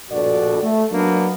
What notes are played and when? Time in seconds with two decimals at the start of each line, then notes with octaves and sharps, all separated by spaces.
0.11 A#1 G2 B2 F#4 A4 D5
0.62 A3
0.92 F#3 A#3 B3 D4